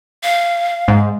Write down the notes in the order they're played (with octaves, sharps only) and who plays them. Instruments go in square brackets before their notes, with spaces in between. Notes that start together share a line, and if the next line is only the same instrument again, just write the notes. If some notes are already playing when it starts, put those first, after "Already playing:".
[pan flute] F5
[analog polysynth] G#2